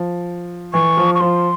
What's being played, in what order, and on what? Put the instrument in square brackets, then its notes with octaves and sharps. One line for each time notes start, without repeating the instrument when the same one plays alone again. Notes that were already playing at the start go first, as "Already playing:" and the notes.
Already playing: [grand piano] F3
[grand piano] E3 [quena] C#6
[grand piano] F3
[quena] C#6
[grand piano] F3 [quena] C6